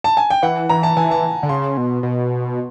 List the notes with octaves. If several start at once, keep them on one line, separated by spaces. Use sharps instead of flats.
A5
G#5
G5
E3 F#5
E3 A#5
A5
E3 G#5
A5
D3
C#3 C6
B2
B2